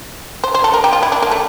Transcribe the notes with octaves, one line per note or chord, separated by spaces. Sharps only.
C5
C5
A4
A#4
G4
F4
E4
D4
A#3
A3